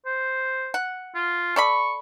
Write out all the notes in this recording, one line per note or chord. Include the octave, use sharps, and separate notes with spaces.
C5
F#5
F4
A4 D5 B5 C#6